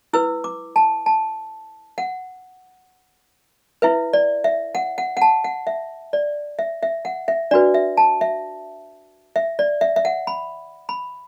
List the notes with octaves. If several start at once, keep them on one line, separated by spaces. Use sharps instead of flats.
E4 B4 E6
D6
A5
A5
F#5
E4 B4 E5
D5
E5
F#5
F#5
F#5
A5
F#5
E5
D5
E5
E5
F#5
E5
D4 F#4 B4 D5
E5
A5
E5
E5
D5
E5
E5
F#5
B5
B5